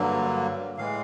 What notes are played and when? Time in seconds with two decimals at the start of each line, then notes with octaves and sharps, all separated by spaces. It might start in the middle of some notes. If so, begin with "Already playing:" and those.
Already playing: G2 D3 F#3 A#3
0.78 A2 E3 G#3 F5